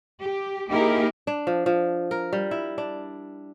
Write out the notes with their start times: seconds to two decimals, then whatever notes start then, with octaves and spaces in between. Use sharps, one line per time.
0.20 G4
0.68 A#3 D#4 E4 G4 G#4 A#4
1.27 D4
1.47 F3
1.66 F3
2.11 A#4
2.33 G3
2.51 E4
2.78 D4